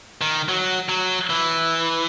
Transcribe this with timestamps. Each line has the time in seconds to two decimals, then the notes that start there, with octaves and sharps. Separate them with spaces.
0.21 D#3
0.49 F#3
0.89 F#3
1.30 E3